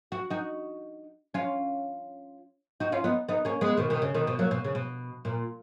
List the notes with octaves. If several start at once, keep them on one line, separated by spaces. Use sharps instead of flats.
F#4
D#4 F#4
C#4 F4
D#4 F#4
C#4 F4
B3 D#4
B3 D#4
A#3 C#4
G#3 B3
B2 D#3
B2 D#3
C#3
B2 D#3
B2
F#3 A#3
B2
C#3
B2
A#2